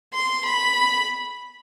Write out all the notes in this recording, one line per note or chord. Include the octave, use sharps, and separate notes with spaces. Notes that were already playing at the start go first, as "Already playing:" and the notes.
C6
B5